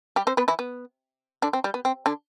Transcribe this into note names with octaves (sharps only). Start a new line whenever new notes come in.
G3 G4
C4 C5
B3 B4
E3 E4
B3
D3 D4
C4
G3
B3
C4
D3 D4